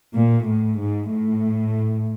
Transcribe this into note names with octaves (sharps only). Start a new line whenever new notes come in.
A#2
A2
G#2
A2